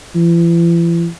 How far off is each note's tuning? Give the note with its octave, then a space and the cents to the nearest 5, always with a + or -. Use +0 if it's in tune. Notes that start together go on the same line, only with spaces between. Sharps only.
E3 +45